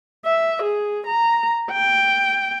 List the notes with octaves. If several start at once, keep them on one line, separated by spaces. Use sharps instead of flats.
E5
G#4
A#5
G5